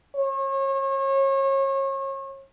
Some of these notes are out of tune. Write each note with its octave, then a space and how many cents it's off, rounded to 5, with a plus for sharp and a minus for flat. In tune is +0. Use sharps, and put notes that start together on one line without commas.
C#5 -35